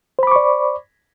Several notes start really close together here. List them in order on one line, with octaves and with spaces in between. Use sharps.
C5 B5 D6 C#6 D5